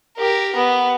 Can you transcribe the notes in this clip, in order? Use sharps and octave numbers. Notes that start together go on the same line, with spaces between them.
G4 A#4
B3